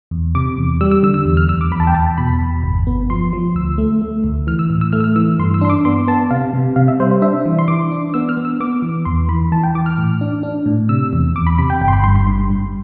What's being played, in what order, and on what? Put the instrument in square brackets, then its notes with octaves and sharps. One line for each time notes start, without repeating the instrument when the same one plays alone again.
[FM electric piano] E2
C3 D6
E2
G3 E6
E6
D3 E6
E6
E2
F6
E2 E6
D6
E2 B5
A5
G5
E2 A5
B2 B5
E2
G1
B3
F3 C6
F3
D2 E6
A3
A3
D2
E3 F6
E6
A2
E6
A3 F6
E6
F6
E3 E6
G2 C6
E6
D4 C6
D6
B3 C6
B3 A5
C3 F5
C3
C3 F5
E5
G3 C5
C5
D4 E5
E3
C6
E3 D6
D4
B3 E6
F6
B3
E6
B3 D6
E3
E2 C6
E3 B5
E3 A5
G5
E3 D6
F6
A2
D4
D4
A2
C3 E6
E2
E2 D6
B5
C3 B5
G5
G1 G5
C6
B5
G2 C6
C6
G2
G2